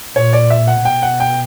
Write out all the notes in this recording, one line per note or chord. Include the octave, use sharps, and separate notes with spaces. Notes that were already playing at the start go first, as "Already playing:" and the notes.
A#2 C#5
D5
E5
F#5
B2 G5
F#5
G5